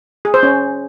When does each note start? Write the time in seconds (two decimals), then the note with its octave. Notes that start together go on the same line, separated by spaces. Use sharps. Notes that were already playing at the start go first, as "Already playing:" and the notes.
0.25 G#4
0.34 C5
0.43 C#4